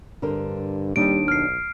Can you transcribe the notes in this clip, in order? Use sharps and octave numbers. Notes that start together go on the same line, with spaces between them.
G2 D3 A#4 C5
D#2 G3 D4 D#4 D7
B1 F6 C7